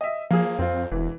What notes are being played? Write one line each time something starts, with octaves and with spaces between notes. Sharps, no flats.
D#5 E5
F3 A#3 G#4
F2 C4 F4
E1 E3